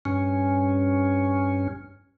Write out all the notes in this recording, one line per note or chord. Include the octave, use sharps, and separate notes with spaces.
G2 C#4